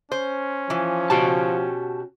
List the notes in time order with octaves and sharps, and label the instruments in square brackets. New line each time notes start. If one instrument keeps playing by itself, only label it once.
[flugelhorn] C#4 [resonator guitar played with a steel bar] C5
[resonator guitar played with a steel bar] E3 [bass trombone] F3
[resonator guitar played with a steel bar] B2 G4 [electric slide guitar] F#4 A5